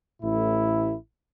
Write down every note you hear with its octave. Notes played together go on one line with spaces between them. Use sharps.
A1 A2 E4